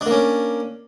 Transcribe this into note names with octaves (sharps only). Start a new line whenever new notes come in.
A#3 C#4 D4